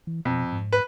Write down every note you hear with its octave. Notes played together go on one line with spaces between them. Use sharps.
E3
F2 B2
G#2
B4